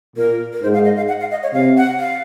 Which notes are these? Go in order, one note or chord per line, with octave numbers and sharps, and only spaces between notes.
A#2 A#4
A#4
G#2 C5
F5
D#5
F5
F#5
F5
D#5
C#5
C3 F5
F#5
F5